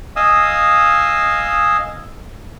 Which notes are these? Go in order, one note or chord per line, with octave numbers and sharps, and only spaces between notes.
D#5 F5 G#5 D#6 E6